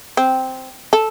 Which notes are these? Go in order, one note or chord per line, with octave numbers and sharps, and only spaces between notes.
C4
A4